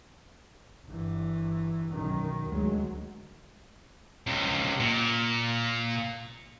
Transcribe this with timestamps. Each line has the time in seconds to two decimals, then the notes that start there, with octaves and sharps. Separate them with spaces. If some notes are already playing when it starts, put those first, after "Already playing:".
0.86 G1 E3
1.90 B1 F#2 D#3
2.48 D2 F#3 G#3
4.27 C#2 C3
4.80 A#2